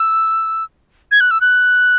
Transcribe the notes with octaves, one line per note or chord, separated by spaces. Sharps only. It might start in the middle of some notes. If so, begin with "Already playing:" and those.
Already playing: E6
G#6
F#6
E6
F#6